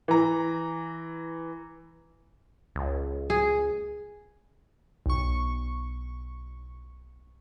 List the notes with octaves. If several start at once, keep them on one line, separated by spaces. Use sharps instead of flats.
E3 A#5
C#2
G#4
B1 C#6